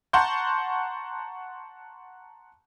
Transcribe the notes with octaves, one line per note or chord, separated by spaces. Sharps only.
F#5 A5 A#5 C6 C#6 G6